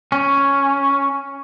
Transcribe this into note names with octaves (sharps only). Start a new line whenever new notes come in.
C#4